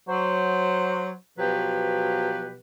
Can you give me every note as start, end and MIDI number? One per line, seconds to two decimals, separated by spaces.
0.08 1.13 54
0.08 1.13 72
1.38 2.57 47
1.38 2.57 53
1.38 2.57 54
1.38 2.57 67
1.38 2.57 71